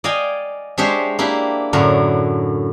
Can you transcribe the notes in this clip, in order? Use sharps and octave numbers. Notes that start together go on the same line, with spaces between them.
D5 D#5 F5 G5 G#5
G#3 D4 G4 C5 C#5 E5
A#3 D4 E4 G4
F#2 A2 D3 F#4 A#4